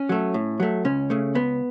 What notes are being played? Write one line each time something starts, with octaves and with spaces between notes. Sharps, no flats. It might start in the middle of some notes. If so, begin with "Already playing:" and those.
Already playing: C#4
F#3 A3
A2
F#3 A3
C#2 C#4
C#3 A3
C#2 B3